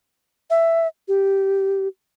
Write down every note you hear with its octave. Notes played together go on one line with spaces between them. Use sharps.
E5
G4